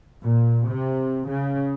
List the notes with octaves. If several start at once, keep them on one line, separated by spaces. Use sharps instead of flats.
A#2
C3
C#3